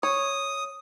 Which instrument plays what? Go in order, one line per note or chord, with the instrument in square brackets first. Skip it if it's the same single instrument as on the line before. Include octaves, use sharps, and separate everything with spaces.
[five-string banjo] C#5 [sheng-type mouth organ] D#6